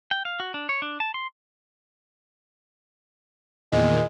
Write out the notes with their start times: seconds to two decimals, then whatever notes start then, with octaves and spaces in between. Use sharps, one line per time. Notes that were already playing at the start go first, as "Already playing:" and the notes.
0.11 G5
0.25 F5
0.40 F#4
0.54 D4
0.69 C#5
0.82 D4
1.00 A5
1.14 C6
3.72 E2 A#2 D#3 G#3